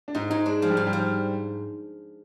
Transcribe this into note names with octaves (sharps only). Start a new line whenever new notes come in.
D4
G#2 D#4
G#2 D#4
G#3 D4
F3 G#3
G3
G#2
G3
F3